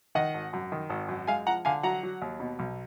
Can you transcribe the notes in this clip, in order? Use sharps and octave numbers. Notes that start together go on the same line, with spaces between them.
D#3 D#5 F#5
G#1
F#2
D#3
G#1
F#2
G#3 F5 G#5
F3 F#5 A#5
D3 F5 G#5
F#3 F#5 A#5
F#3
D#2
B2
B1